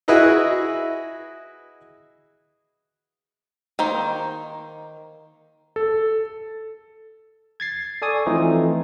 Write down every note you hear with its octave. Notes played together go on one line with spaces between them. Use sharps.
E4 F#4 G#4 B4 D#5 E5
D#3 A#3 C5
A4
G#6 A6 C7
A4 D5 G#5 C#6 D#6
E3 F3 A3 C4 D#4 F4